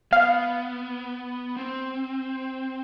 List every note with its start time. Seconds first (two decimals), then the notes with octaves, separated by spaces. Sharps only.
0.12 B3 F5
1.56 C4